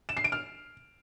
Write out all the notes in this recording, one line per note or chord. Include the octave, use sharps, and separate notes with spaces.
E7
C7
D7
F6